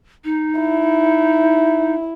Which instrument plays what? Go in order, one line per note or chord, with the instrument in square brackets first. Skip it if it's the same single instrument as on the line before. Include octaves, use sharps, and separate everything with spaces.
[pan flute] D#4
[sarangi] E4